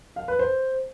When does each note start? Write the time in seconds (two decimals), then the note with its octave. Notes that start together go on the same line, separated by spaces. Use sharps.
0.16 F5
0.28 B4
0.39 C5